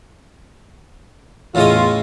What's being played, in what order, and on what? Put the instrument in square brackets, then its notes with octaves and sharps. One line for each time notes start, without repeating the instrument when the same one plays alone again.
[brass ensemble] E2 F4 [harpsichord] A2 C#3 D#5